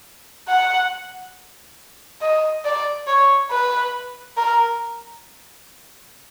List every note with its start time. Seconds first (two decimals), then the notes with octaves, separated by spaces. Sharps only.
0.48 F#5
2.21 D#5
2.65 D5
3.07 C#5
3.51 B4
4.37 A#4